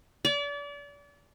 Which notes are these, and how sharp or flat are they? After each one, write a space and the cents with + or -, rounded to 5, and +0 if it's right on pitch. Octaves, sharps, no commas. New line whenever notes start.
D5 -35